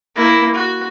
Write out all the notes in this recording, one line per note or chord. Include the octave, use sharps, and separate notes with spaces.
A#3 E4
F#4